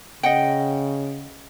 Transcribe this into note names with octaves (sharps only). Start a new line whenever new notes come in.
C#3 D#5 F#5 G5